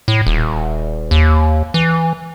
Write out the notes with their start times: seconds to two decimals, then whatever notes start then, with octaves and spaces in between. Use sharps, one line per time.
0.08 A2
0.27 D#1
1.11 D#2
1.74 E3